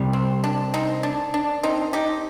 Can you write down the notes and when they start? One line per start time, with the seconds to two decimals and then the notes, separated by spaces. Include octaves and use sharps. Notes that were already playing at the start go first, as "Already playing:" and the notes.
Already playing: C2 C3 G3
0.13 C4
0.44 D4
0.74 C4 D#4
1.03 D4
1.34 D4
1.63 C4 D#4
1.93 D#4 G4